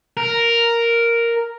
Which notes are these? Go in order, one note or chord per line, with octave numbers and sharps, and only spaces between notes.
A#4